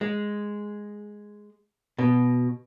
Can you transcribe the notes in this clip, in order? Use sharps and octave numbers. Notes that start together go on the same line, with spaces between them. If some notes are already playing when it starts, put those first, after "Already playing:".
G#3
B2